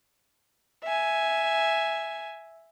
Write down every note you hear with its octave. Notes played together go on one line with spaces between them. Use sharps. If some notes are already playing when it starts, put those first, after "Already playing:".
E5 G#5